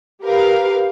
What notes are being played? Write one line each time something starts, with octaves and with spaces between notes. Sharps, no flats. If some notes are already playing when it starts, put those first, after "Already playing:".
G4 A#4 B4 F5